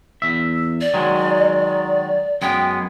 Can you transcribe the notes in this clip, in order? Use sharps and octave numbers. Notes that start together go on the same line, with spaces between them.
E2 E5
D5
D#3 F#3 G#3
F#2 G#3 B3 G5